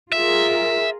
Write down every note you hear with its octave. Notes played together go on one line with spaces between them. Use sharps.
F4 G#4 A#4 E5